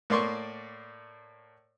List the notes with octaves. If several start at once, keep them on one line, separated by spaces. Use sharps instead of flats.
A2 A#3 D5 C6 C#6